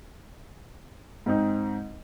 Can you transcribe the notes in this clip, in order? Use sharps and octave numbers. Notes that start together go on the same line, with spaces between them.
G#2 C4 D#4